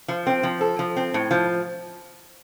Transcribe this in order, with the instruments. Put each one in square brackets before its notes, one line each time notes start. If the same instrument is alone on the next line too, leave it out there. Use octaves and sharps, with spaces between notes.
[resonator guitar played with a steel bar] F3
C4
F3
A4
F3
C4
A2
F3